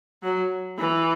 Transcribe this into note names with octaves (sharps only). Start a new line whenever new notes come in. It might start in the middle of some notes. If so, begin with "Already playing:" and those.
F#3
E3